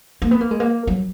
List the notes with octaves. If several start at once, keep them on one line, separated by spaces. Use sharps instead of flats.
A#3
B3
A#3
G#3
A#3
F#3